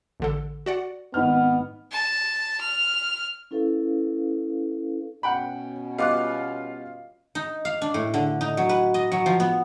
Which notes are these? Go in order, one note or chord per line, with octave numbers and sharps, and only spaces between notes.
A1 D3 A4
F#4 D5 F#5
G#1 B3 D#4 F6
A5
F6
C#4 E4 A4 B4 F5
B2 C#4 F#5 G5 B5
G3 B3 F4 D#5 F5 D6 F#6
D#4
F5
D4
A2
D3
D#4
F#3
B4
D#5
F#3
F3
B3